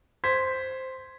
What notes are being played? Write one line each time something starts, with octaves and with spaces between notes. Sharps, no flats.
C5 G#6 B6